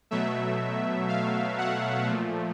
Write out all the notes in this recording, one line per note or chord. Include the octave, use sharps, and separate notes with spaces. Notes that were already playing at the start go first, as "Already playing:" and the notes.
B2 F#3 A3 E5
F5
F#5
A#2 F3 A3